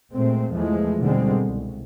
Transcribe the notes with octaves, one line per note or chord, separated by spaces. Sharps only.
A#2 G#3 A3 C4
E2 E3 F3 G#3 A3
B2 D3 D#3 G3 G#3 C4
C2